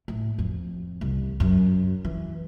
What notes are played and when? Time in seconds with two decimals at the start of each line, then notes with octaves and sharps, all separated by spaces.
0.08 A2
0.38 F2
1.01 C2
1.40 F#2
2.05 E3